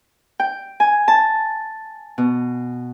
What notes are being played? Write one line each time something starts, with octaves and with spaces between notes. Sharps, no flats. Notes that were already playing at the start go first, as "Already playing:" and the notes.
G5
G#5
A5
B2